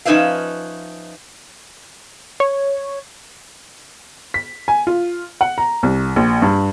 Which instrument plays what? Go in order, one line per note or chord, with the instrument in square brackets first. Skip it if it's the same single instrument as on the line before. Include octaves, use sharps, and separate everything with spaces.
[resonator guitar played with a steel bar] F3 C#4 D#4 B4 E5 F5
[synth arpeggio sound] C#5
[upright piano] B6
G#5
F4
F#5
A#5
C2
A#1
G2